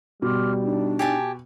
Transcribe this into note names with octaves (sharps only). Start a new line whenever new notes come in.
B2 G3 C6 D6 F6
D4 D#4
G4 G#5 A5